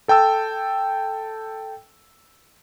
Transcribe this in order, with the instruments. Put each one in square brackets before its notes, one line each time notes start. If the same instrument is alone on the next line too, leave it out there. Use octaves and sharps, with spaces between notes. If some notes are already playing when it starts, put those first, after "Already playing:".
[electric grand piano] A4 G5 A5 E6